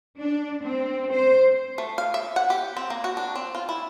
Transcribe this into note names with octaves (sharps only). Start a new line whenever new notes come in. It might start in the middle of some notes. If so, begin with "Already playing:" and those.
D4
C4
C5
A3
F5
E5
F#5
G4
C4
A#3
F#4
D4
C4
F4
E4